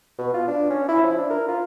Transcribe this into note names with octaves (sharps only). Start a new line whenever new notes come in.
B2
F4
D4
C#4
E4
F3
D4
A#4
F4